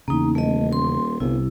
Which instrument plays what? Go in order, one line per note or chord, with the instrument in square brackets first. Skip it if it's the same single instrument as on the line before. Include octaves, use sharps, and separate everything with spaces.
[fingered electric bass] E2 C#3 [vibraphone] A#3 D#4
[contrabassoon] D#1 [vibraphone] A3 D#5
[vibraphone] C6
[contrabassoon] G1 [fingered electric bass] C2 C3 [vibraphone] E4